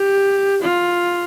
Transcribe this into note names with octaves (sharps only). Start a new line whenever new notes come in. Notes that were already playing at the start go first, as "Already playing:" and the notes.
Already playing: G4
F4